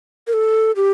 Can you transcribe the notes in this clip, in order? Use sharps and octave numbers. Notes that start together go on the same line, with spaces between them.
A#4
A4
G4